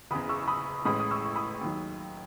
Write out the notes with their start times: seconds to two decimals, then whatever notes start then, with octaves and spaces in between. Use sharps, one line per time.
0.11 F#1 E2 C#3 B5 D#6
0.29 C#6 E6
0.48 B5 D#6
0.85 A1 A2 G#3 C#4 B5 D#6
0.99 D#6
1.11 C#6 E6
1.24 C#6
1.36 B5 D#6
1.61 D#2 D#3 F#3